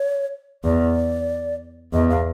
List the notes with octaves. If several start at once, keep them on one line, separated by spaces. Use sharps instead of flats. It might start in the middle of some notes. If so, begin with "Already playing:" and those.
Already playing: C#5
E2 D5
E2 D#5
F5